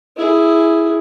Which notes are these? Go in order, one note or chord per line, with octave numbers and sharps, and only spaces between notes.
E4 G#4